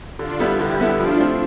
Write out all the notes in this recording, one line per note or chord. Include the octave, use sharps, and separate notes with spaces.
D3 D4 F4
G3 B3 E4 A4
D3 E4 G4
G3 B3 E4 A4
F3 D4 F4
A3 C4